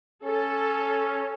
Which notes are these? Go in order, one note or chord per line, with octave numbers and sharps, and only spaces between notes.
C#4 A4